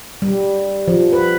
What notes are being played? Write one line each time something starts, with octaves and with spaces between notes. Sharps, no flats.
G3
F3
B4